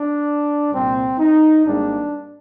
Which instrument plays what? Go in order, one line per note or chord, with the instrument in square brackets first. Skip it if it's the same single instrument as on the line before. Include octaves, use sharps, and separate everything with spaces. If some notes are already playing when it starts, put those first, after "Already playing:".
Already playing: [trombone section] D4
C2 A#2 G3 A#3 C4
D#4
G#1 G#2 G3 A#3 D4